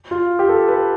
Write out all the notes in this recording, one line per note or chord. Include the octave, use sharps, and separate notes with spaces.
F4
G4
A4
B4